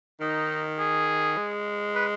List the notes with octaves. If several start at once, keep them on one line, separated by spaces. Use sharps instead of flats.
D#3 D#4
G#4
G#3
B4